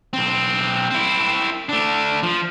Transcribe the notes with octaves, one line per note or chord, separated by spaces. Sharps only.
B1 C4
C4 E4
A3 D4
F3